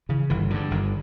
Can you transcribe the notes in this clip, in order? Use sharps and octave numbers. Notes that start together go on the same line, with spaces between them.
C#3 E3
G1 E3
G2 D3 D#3
G1 D#3